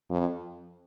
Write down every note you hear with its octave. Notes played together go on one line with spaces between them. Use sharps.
F2